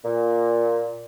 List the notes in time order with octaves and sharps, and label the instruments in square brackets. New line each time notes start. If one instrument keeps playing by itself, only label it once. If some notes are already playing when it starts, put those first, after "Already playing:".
[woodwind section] A#2